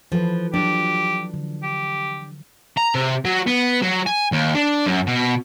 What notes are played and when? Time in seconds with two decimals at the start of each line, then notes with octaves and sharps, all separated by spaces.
0.12 E3 F3 A4 B4
0.54 F3 F#3 D4 G4
1.34 D3
1.63 G4
2.77 A#5
2.95 C3
3.25 F#3
3.47 B3
3.83 F#3
4.06 G#5
4.32 D#2
4.55 D4
4.86 F#2
5.07 B2